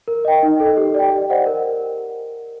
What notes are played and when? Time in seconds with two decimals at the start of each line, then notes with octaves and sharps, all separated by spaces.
0.08 A#4
0.25 D#5 G5
0.43 D#4
0.60 A4 D#5
0.77 G4
0.95 D5 G5
1.12 G4
1.30 C5 D#5 F#5
1.46 A#4